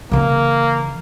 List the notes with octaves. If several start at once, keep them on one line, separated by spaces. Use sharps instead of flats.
C#3 E3 A#3